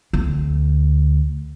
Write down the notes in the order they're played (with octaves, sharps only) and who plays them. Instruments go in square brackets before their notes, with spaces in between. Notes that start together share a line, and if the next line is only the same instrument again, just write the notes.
[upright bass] D2